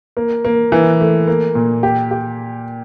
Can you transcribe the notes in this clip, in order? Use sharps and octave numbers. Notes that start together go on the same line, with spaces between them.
A#3
A#3
E3
A3
A#3
A#2
G4
G4